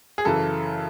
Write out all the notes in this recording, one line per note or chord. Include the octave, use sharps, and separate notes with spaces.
G#4
F#2 C#3 E3 A4